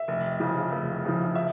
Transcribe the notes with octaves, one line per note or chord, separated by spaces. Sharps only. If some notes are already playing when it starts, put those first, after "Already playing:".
Already playing: E5
F1
F2 C#3 F3
F1
F2 C#3 F3
E5